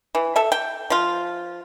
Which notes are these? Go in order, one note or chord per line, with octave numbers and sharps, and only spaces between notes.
E3
A4 E5
G5
F3 F4